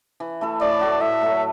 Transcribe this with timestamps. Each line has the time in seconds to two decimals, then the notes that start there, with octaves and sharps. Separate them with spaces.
0.20 E3
0.41 A3 E4 A4
0.61 A2 D5
0.81 A3 F#4
1.01 A2 E5
1.21 F#3 A3